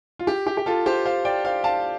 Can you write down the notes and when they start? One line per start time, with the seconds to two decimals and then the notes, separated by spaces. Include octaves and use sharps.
0.19 F4
0.27 G4
0.47 G4
0.57 G4
0.66 F4 A4
0.86 G4 C5
1.05 C5 F5
1.25 D5 G5
1.44 C5 F5
1.64 F5 A5